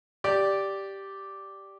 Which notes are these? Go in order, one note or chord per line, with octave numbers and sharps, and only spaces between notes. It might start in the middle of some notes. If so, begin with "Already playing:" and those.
G4 D5